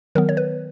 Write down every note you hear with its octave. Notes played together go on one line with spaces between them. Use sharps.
D#3 F#3 B3 A#4
C#5
B4